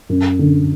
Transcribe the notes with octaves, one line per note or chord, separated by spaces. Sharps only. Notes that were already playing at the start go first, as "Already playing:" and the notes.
F#2
D3